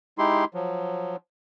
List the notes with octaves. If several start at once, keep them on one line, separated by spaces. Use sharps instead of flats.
G#3 D#4 E4 G4 C6
F3 F#3